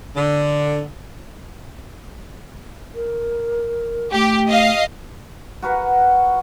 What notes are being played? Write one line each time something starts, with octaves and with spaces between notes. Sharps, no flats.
D3
A#4
A3 G4
D#5 F5
F#4 A#4 B4 F#5